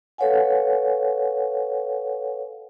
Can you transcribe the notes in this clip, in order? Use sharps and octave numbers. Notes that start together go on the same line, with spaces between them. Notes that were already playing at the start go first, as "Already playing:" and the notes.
A4 B4 C#5 F5 F#5 G#5